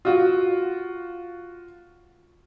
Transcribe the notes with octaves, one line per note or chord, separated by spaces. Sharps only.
F4 F#4